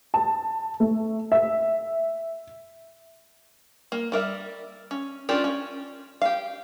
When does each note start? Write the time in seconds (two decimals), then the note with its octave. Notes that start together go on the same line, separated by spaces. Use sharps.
0.14 A5
0.80 A3
1.32 E5
3.92 A#3
4.12 G3 A#4 E5
4.91 C#4
5.29 C#4 D4 F4 G4 A#4
5.44 C#4
6.21 G4 F5